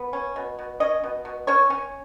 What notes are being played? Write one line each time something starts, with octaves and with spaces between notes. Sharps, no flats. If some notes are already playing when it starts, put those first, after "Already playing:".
Already playing: B3
C#4
B2
B2
C#4 D#5
B2
B2
C#4 C#5
C#4